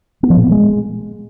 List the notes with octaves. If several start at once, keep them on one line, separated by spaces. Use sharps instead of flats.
B3
F3
A#2
B3
G#3